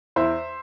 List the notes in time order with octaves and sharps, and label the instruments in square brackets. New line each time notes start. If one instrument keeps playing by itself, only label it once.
[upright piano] E2 C5 E5